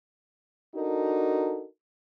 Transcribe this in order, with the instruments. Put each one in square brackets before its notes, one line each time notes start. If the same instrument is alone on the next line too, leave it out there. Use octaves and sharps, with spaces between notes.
[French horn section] D4 D#4 F#4 A4 A#4